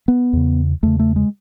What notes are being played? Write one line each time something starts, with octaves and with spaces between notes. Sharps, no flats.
B3
E2 C#3
E2 C#3 A3
A3
G#3